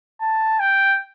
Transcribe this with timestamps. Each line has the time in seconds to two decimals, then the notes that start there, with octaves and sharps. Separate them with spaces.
0.21 A5
0.60 G5